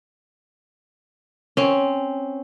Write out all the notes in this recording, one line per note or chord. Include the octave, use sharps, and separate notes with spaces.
C4 C#4